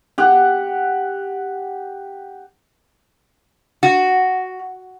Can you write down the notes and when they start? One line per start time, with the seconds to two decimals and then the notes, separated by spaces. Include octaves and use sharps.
0.18 G4 F#5
3.83 F#4